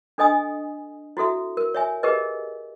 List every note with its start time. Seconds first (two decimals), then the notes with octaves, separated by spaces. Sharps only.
0.18 D4 A4 D#5 G#5 D#6
1.17 E4 F#4 A4 E5
1.57 A#4
1.74 C#5 E5 G#5
2.03 G4 G#4 A#4 B4 D#5